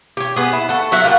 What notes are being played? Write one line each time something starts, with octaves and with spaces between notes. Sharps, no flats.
G4 C#5
B3 G#4
E4
F#4 A4
F#3 E5 F#5
F4 G4 A#4 F#5